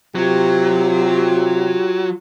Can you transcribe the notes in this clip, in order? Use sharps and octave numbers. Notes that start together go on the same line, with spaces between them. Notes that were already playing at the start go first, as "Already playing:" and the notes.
C3 F#3 F4 G4